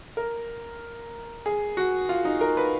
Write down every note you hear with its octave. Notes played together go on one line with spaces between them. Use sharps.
A#4
G#4
F#4
F4
D#4
A#4
B4